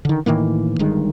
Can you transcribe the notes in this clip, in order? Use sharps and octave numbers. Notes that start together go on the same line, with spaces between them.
D3 D#3
A2 D#3 E3 A#3
G1 G2 D#3 G#3